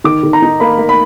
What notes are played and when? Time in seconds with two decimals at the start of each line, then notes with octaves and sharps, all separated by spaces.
0.04 D#3 D6
0.23 D#3
0.33 A#5
0.42 D#4
0.60 A#3 B5
0.78 A#3
0.89 B5